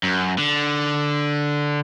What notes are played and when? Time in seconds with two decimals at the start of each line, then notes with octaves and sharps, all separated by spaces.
0.03 F#2
0.38 D3